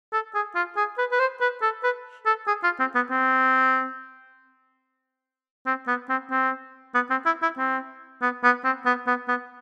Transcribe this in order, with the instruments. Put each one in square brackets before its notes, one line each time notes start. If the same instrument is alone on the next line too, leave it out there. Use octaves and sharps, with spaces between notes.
[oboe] A4
G#4
F4
G#4
B4
B4
C5
B4
A4
B4
A4
G#4
F4
C4
B3
C4
C4
B3
C4
C4
B3
C4
E4
E4
C4
B3
B3
C4
B3
B3
B3